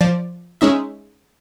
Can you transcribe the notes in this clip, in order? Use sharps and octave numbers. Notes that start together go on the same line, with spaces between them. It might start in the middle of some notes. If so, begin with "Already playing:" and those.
F3 D5
G#3 C#4 D#4 E5